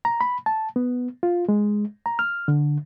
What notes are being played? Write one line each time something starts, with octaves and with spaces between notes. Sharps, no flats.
A#5
B5
A5
B3
F4
G#3
A#5
F6
D3